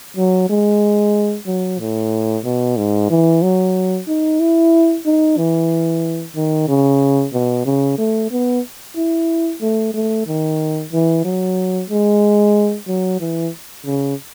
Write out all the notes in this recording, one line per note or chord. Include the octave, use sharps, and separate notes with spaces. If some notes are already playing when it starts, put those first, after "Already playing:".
F#3
G#3
F#3
A2
B2
G#2
E3
F#3
D#4
E4
D#4
E3
D#3
C#3
B2
C#3
A3
B3
E4
A3
A3
D#3
E3
F#3
G#3
F#3
E3
C#3